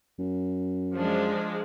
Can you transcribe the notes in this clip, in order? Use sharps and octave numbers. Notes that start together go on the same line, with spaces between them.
F#2
F3 G#3 D4